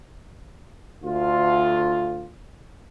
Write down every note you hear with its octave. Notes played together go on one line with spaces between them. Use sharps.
D2 F4